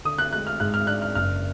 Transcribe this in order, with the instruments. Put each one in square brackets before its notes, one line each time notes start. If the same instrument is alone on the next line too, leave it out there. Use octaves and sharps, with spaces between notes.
[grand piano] D3 [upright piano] D#6
[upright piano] F#6
[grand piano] G#3 [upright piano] F#6
[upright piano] F6
[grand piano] G#2 [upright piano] F#6
[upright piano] F6
[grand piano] D4 [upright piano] F#6
[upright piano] F6
[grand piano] F#1 [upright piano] F6